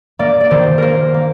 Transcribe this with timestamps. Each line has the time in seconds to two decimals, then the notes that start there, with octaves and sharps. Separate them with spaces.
0.19 A#3 D5
0.40 D5
0.51 D#3 C5
0.78 A#3 A#4 C5
1.14 A#3